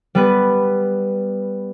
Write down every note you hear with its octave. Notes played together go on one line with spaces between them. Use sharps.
G3 B3 B4